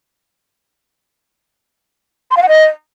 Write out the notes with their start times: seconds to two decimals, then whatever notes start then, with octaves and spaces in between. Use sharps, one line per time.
2.31 C6
2.37 F5
2.43 F#5
2.48 D#5